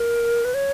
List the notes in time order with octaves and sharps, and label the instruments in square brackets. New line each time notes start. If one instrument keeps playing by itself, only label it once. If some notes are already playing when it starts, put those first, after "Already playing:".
Already playing: [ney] A#4
B4
C#5